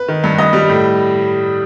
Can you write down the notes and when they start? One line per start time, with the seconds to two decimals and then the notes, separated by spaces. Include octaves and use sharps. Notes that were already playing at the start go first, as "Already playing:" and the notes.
Already playing: B4
0.08 D#3
0.24 G2
0.38 G2 D#5
0.53 G3
0.69 A2